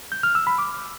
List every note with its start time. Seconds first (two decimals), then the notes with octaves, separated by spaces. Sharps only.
0.12 G6
0.23 F6
0.35 E6
0.47 B5
0.58 D6